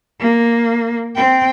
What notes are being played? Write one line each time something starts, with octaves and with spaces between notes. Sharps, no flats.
A#3
C4 G5